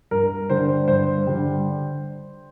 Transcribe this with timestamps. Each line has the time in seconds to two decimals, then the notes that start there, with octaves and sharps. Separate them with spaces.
0.11 G2 A#4
0.50 D3 G3 D4 C5
0.88 G2 C5
1.26 D3 G3 D4